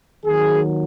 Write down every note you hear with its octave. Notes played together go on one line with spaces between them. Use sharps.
D#2 D#3 F#3 G#4